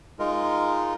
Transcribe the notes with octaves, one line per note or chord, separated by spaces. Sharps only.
G#3 D#4 F4 A#4